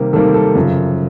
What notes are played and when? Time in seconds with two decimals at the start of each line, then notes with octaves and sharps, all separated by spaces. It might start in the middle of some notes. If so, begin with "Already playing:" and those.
Already playing: C3 D#3 G3 A#3
0.13 C3 D#3 G3 A#3 A4
0.34 A4
0.55 F#2 C#3 F3